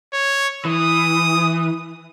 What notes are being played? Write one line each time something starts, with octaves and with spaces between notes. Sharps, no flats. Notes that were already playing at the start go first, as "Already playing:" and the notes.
C#5
E3 D#6